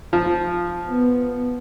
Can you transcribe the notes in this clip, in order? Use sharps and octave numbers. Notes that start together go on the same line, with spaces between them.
F3
B3